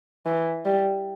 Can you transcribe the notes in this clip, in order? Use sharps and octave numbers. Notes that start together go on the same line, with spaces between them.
E3
G3